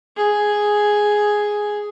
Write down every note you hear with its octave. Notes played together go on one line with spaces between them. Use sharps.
G#4